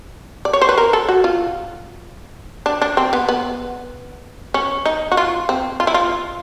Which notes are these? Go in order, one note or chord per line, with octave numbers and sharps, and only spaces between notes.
D5
C#5
C5
B4
A#4
A4
F#4
F4
D4
D4
C4
B3
B3
C#4
D#4
F#4
F4
C4
F4
E4
F4